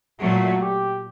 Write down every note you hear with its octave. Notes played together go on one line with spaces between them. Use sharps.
A#2 F#3 A3 F#4
G4